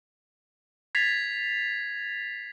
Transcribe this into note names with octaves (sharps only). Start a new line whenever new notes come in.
G#6 A6 B6 C7 F7